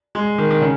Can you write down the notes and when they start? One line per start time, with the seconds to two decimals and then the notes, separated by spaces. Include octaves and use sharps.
0.15 G#3
0.38 D#3
0.51 D#3
0.62 C#3